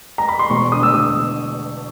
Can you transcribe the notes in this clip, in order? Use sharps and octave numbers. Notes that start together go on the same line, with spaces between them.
A#5
B5
C6
E1 C#6
D3 D#6
E6
E1 D#6